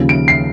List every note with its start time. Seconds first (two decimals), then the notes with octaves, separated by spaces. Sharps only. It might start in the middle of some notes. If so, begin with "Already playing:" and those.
Already playing: D#2 C#3 F3
0.09 D7
0.28 C7